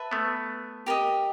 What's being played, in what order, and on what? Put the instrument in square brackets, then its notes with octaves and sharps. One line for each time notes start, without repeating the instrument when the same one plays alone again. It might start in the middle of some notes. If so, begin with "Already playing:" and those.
Already playing: [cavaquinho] B4 E5 A5
[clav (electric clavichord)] A3 B3
[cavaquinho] G4 A#4 D#5